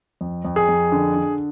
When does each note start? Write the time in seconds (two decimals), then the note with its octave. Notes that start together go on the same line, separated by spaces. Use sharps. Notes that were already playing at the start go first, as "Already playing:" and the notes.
0.21 F2
0.45 F2
0.56 G#4
0.69 F2
0.92 D3
1.16 D3